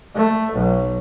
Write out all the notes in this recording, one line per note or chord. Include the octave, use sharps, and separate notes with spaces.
A3
B1